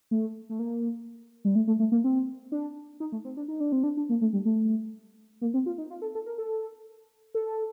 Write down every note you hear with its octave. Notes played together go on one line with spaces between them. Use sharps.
A3
A3
A#3
G3
A3
A3
A3
A#3
C4
D4
D#4
A3
C4
D4
D#4
D4
C4
D4
D4
A#3
A3
G3
A3
A#3
C4
F4
D#4
F4
A4
A4
A#4
A4
A4